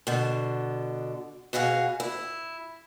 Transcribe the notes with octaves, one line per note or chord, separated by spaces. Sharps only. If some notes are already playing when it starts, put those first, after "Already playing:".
B2 D3
B2 F#4 G#4 D#5 F5
E4